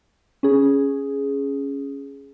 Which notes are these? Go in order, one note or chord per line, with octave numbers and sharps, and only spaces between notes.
C#4 G#4